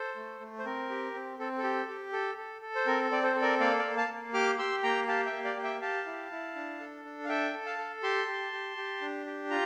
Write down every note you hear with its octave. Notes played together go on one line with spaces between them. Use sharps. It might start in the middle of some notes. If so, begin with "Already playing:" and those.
Already playing: A4 C5
A3
A3
C5
C4 A#4
G4
C4
C4 A4
A4
G4
G4
A4
A4
A4
C5
C4 A#4
C4 D5
A4 C5
A4
A#4 D5
A#3 D5 F5
D5 F5
A#3
F5 A5
A#3
G4 D6 F6
G4 C6 E6
A#3 G5 A#5
G4 F5 A5
E5 G5
A#3
D5 F5
G4
E5 G5
G4 F5 A5
E4
E4
D4
A4
D4
F5
A4 E5 G5
A4
F5 A5
A4
G4 A5 C6
G4
G4
G4
D4
G4
F4 A#5